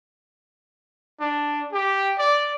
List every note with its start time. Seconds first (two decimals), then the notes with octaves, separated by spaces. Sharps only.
1.20 D4
1.72 G4
2.18 D5